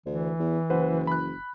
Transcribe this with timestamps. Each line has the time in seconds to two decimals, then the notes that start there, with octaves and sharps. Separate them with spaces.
0.06 D2 E3
0.39 E2
0.70 F#1 B4 C5 F#5
1.07 B5 F#6